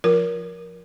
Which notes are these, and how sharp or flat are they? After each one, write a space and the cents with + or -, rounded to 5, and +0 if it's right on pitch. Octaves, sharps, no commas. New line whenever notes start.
F3 +0 F4 +0 A#4 +15